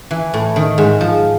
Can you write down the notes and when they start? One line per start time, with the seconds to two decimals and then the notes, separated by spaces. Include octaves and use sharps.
0.11 E3
0.34 A2
0.56 D#3
0.78 G#2
1.01 F3